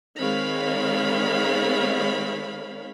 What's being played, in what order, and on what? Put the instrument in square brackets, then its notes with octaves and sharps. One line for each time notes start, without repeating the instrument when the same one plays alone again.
[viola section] D#3 G#3 C4 C#5 F5 B5